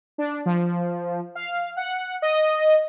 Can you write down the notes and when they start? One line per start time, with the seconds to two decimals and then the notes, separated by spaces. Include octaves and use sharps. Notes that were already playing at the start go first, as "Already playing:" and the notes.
0.18 D4
0.46 F3
1.35 F5
1.77 F#5
2.22 D#5